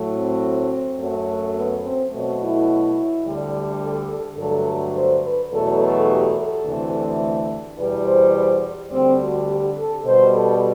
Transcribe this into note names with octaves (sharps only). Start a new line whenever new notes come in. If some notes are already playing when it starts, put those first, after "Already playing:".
Already playing: A2 F#3 A3
C4
F#2 F#3 A3
B3
C4
B2 F#3 A3 C4
E4
D2 D3 G3
A4
A4
G2 D3 F#3 A3 A4
C5
B4
E2 B2 F#3 A3 A4
A4
G4
A4
D2 C3 E3 A3
E2 B2 G3 B4
C5
C5
D2 D3 G3 C4
F#4
G4
A4
B2 G3 C5
A4